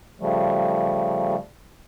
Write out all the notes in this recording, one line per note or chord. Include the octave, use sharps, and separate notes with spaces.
C#3 F3 G3 A3